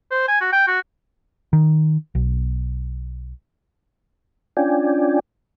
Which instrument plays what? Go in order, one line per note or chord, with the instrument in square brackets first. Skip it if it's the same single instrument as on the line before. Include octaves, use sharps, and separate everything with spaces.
[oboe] C5
G#5
F#4
G5
F#4
[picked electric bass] D#3
B1
[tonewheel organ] C#4 D4 F4 D5 G5 G#5